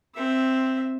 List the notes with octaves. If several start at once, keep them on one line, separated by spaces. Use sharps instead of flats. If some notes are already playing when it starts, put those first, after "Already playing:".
C4 E5